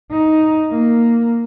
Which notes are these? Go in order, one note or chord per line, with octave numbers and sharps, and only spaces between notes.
D#4
A#3